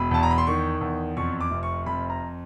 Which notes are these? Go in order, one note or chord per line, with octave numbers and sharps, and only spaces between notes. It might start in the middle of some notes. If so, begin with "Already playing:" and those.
Already playing: E1 B5
E2 A5
A#5
B5
C6
D#3 C#6
E2
F2 C#6
D6
F1
C#6
F2 B5
A#5